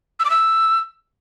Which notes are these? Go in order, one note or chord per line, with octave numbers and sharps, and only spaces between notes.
E6
D6
E6